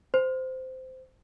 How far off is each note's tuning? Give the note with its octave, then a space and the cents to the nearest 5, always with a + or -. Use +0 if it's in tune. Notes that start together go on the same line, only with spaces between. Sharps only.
C5 -15